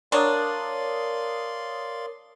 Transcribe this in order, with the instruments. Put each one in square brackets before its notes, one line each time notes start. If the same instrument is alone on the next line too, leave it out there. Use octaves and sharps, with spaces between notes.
[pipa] F#3 D4 [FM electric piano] A#4 C#5 D#6 [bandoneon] D5 F5 C6